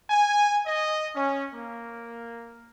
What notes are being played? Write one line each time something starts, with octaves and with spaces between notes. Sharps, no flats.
G#5
D#5
C#4
A#3